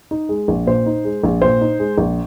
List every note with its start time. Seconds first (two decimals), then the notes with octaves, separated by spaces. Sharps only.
0.11 D#4
0.29 G#3
0.48 A#1
0.67 A#2 C5
0.86 D#4
1.05 G#3
1.23 A#1
1.42 A#2 C5
1.61 D#4
1.79 G#3
1.98 A#1